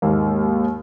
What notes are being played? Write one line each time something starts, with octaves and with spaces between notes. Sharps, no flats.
D#2 G#2 A#3